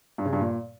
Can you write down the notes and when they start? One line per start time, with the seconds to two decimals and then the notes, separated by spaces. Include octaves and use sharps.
0.18 G2
0.25 C#3
0.33 G2
0.40 A#2